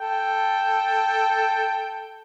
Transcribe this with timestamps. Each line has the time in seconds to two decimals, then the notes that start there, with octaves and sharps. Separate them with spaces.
0.01 A4 G5